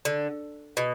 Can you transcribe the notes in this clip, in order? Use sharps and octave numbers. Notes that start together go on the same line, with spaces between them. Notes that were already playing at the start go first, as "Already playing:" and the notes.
D3
B2